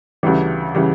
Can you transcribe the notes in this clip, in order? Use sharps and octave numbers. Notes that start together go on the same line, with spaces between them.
D2 C#3 E3 G3
C#3 E3 G3